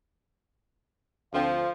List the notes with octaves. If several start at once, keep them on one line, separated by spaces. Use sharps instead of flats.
D2 D3 F3 C4 F5